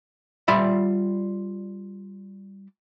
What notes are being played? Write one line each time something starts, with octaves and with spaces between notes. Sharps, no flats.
G3 F4 D5 E5 B5